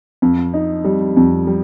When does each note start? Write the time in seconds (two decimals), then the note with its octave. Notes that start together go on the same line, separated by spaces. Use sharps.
0.22 F2
0.54 D#4
0.84 G3
1.17 F2
1.47 G3